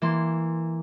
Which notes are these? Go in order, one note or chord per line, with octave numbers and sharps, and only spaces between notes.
E3 A#3 C6